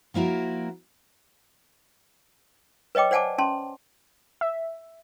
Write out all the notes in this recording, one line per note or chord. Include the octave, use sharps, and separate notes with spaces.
F3 A#3 E4 F#4 A#4
B4 C#5 D#5 G5 D6
C5 D5 F#5 G#5 A5 D6
C#4 A5 C6
E5